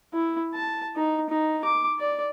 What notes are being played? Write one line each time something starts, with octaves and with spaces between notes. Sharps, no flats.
E4
A5
D#4
D#4
D6
D5